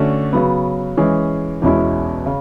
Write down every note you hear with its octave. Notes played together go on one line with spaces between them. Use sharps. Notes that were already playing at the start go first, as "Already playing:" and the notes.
Already playing: D3 A3 C#4 F#4 A4
C#3 F#3 B3
E3 G#3 C#4 G#4
E2 B2 G#3 C#4 E4
C#3